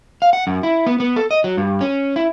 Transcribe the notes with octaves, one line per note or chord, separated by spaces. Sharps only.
F5
F#5
F#2
E4
B3
B3
A4
D#5
F#3
G2
C#4
E4